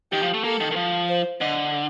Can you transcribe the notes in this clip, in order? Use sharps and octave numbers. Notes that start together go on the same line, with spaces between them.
D#3 G4
F3
A3
A#3 A4
D#3
D#3
F3
C5
D3 D#5